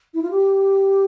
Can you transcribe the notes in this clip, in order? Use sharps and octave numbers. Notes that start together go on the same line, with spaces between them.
E4
F4
G4